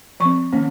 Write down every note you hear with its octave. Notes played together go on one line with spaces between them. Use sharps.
F3 C4 C#6
D#3 A#3 C#4